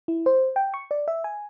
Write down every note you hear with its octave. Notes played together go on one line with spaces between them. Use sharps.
E4
C5
G5
C#6
D5
E5
G#5